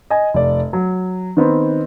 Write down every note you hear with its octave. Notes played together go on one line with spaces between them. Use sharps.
D#5 G#5
F1 D5
F#3
D#3 B3 C4